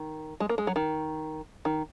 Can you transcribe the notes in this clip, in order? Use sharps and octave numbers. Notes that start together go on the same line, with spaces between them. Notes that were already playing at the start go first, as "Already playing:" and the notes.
Already playing: D#3
G#3
A#3
G#3
F#3
D#3
D#3